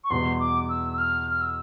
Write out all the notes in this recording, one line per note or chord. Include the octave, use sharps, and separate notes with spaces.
C#6
E2 B2 G3 B3 C6
D6
E6
E6
F6
F6
E6